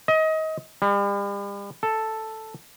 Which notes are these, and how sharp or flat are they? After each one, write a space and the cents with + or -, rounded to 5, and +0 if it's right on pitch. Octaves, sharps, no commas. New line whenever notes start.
D#5 +25
G3 +40
A4 +0